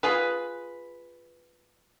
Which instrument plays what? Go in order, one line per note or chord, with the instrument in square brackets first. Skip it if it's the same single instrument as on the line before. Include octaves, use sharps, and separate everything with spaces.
[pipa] F4 G#4 B4